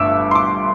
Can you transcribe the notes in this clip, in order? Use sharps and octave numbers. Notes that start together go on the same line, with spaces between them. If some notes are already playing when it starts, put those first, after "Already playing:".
Already playing: G1 G2 A3 E5 D6 E6
C6
D6